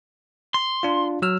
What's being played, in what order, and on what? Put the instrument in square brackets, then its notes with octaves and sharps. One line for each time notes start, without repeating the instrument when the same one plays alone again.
[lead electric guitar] C6
[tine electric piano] D4 F4
F#3 E6 F6